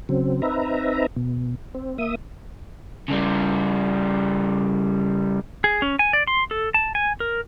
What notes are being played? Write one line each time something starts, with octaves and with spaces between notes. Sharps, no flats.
C#3 F#3 C4
C4 D#4 B4 E5 A#5
B2
C4
A#3 E5 D#6
C#3 G3
G#4
C#4
G#5
D5
C6
A4
A5
G#5
A#4